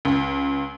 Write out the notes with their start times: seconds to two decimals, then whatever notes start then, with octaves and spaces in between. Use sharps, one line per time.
0.05 C#2